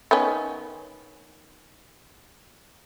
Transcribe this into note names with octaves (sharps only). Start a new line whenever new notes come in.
D#3 B3 C#4